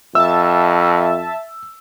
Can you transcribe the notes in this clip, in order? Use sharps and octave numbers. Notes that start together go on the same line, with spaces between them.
F2 E5 A5 E6